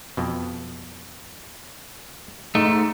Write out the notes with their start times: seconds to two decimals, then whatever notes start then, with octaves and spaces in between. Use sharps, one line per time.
0.17 F2 B2
2.55 G#2 A3 D#5